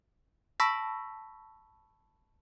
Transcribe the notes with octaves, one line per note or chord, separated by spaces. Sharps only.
A5 B5 C#6 E6 A#6 B6